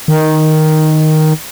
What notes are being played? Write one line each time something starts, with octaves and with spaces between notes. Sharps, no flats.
D#3